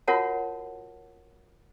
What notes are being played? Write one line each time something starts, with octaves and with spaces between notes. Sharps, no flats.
F4 F#4 A#4 C#5 F#5 A5